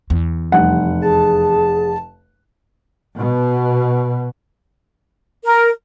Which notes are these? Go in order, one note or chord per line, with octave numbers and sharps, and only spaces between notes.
E2
F1 G3 F#5
G#4 A5
B2
A#4